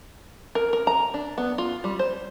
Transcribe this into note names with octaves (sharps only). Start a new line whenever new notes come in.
A#4
A#4
A#5
D4
B3
F4
G3
C5